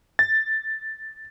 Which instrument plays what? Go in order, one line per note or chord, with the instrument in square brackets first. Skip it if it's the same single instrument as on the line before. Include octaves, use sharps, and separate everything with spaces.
[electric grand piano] A6